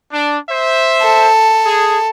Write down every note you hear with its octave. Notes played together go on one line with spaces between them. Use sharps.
D4
C5 E5
A4
G#4